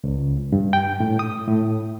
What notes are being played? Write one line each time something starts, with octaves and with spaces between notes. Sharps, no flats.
C#2
G2
G5
A2
D#6
A2